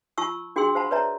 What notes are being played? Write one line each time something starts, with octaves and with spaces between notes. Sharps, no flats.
F4 A5 C#6 E6
D4 F#4 G#4 G5 C6 E6
C5 F5 F#5 A5 B5 C6
B4 C#5 D5 E5 A5 A#5